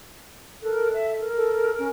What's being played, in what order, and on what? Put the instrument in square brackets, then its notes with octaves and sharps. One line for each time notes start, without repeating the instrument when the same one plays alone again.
[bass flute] A4 [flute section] A#4 F#6
[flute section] E5
A#4
[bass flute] A4
C#4